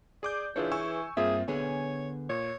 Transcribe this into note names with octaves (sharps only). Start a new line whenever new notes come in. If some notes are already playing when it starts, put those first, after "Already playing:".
G#4 D5 D6 G6
E3 D4 F4 G#4 B4 C#5
G#5 C#6 E6
G2 A#3 C4 F4 G#4 E5
D3 B3 G#4 C#5 G#5
A#2 C#5